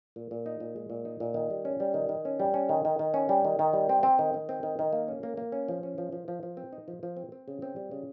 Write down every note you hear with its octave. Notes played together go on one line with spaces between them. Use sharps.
A#2
A#2
D#4
A#2
G#3
A#2
D#4
A#2
D#3
G3
C#4
G3
D#3
D#3
C#4
G3
C#4
D#3
D#3
D#3
C#4
G3
D#3
D#3
G3
C4
C4
D#3
D#3
C4
D#3
D#3
A#3
C#4
A#3
A#3
C#4
F3
C#4
F3
F3
F3
F3
C4
D#4
F3
F3
C4
C4
C#3
C4
G3
C#3